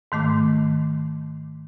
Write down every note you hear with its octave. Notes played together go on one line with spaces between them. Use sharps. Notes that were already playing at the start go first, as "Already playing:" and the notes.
G#2 D#3 A3 D6